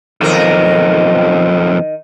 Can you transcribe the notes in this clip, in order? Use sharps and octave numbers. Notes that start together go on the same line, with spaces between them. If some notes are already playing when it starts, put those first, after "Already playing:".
B1 F2 D#3 A#4